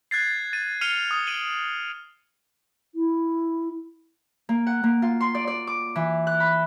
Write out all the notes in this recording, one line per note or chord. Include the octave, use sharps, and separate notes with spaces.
F#6 G#6 A6 C7
A6 D#7
F6 C7 C#7 D#7 F7 G7
D#6
D7 D#7 F#7 G7
E4
A#3
F#5
A#3
F4
C6
D5
D5
D6
E3
F#6
B5